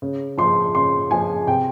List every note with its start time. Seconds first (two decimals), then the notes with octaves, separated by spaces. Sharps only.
0.02 C#3
0.38 F3 G#3 C6
0.75 C#3 C6
1.11 F3 G#3 G#5
1.47 C3 G5